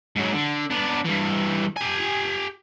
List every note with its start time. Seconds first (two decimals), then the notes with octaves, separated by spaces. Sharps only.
0.16 G#2 F#3
0.34 D3
0.70 B3 D4
1.05 G2 E3
1.77 G4 G#5